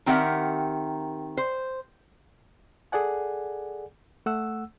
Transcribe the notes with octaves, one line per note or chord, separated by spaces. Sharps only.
D#3 C4 G4 A#4 E5 F#5
C5
G#4 A4 D5 F#5 G#5
A3 F#5 E6